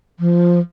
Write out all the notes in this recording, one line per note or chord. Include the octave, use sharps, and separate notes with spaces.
F3